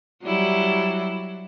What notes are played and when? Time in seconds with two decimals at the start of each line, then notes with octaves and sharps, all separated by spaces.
0.23 F#3 G3 E4